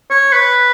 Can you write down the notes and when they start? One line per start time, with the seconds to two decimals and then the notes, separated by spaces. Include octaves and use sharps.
0.10 C#5
0.32 B4